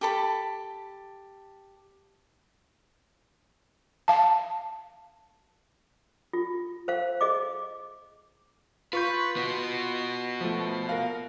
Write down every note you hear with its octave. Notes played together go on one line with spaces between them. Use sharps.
G4 A4 B5
F5 A5
F4
C5 F5
G#4 D#5 D6
F4 B4 C#6 G6
B3 F#4
F3 A3
A#4 F5